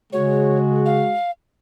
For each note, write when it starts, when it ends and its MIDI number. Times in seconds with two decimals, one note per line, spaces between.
0.13 1.04 49
0.13 1.15 56
0.13 1.15 66
0.13 0.58 73
0.86 1.31 77